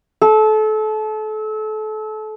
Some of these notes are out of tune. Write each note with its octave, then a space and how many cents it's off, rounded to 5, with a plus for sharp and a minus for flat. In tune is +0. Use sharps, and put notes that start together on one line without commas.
A4 -30